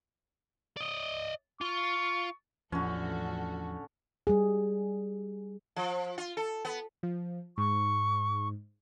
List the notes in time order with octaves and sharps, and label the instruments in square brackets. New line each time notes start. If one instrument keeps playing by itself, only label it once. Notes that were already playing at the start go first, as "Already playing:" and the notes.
[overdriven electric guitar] D5 D#5
[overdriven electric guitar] F4 [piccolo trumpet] C#6
[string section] A1 F#4 A4 [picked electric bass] E2 [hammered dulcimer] D3 C#4 [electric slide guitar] F3
[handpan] G3 G#4
[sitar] F3
F4
A4
B3
[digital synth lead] F3
[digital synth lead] G#2 [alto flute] C#6